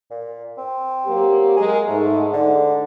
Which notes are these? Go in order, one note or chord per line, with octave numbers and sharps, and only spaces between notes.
A#2
C4
F#3 A#3 G4
G#3 G#4 A#4
G#2 A3
D3